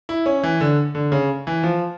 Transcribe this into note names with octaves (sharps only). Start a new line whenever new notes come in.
E4
C#4
E3
D3
D3
C#3
E3
F3